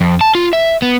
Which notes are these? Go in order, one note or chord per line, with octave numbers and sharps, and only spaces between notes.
F2
A5
F4
E5
B3